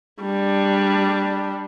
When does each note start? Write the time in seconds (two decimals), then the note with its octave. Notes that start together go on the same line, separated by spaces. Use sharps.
0.22 G3 D4